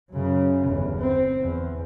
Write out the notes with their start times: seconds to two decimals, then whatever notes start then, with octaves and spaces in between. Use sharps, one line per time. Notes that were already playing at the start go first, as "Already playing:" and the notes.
0.12 F#2 C#3
0.68 G1 E2
1.00 C4
1.41 E2